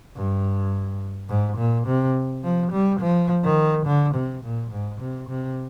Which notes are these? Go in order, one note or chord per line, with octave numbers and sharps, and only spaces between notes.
G2
G#2
A#2
C3
F3
G3
F3
D#3
D3
C3
A#2
G#2
C3
C3